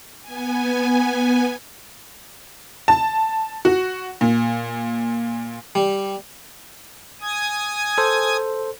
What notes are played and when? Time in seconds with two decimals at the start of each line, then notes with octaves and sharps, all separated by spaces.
0.22 B3 G#5
2.88 A5
3.65 F#4
4.21 A#2
5.75 G3
7.21 G#5 D#6 G#6
7.98 A4 C5